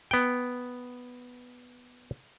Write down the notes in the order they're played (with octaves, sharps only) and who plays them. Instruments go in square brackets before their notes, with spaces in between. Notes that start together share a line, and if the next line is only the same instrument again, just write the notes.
[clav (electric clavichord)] B3 G5